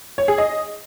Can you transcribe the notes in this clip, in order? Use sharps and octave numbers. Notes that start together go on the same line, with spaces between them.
C#5
G#4
D#5